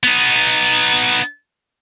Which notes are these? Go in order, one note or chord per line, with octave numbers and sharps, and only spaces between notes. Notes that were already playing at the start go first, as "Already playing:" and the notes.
B3 D#4